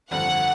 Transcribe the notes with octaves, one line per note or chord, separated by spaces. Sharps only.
G1 F2 D3 G3 C4 F#5